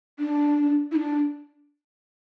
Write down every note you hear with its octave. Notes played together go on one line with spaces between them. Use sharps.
D4
E4
D4